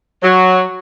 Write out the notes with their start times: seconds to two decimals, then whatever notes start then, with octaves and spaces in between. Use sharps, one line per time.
0.23 F#3